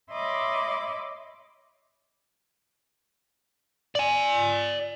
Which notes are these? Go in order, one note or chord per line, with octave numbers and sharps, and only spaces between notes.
C#5 D#5 E5 B5 C6 D6
D5 G#5